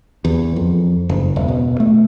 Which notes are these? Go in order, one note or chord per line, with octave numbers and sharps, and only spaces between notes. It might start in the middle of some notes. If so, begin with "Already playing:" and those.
E2
F2
F#1
E1
B2
A3